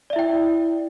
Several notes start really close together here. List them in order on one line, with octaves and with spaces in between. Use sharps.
D5 E5 E4 G5